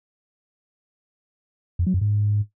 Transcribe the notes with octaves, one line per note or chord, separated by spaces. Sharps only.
F2
F#3
F#2
G#2